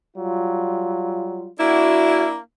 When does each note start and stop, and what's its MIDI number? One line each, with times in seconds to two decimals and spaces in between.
0.17 1.49 54
0.17 1.49 55
0.17 1.49 65
1.60 2.38 58
1.60 2.38 62
1.60 2.38 64
1.60 2.24 66